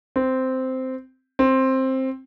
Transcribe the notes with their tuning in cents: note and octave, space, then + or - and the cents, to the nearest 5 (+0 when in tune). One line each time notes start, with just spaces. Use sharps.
C4 -10
C4 +10